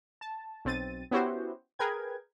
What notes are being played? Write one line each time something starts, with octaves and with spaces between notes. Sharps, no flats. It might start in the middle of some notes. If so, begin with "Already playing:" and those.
A5
B1 C4 A6 D#7
B3 C#4 E4 F#4 G4 C5
G#4 A#4 B4 G5 G#6